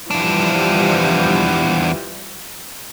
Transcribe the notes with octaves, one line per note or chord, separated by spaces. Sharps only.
E2 E3 F3 G3 D4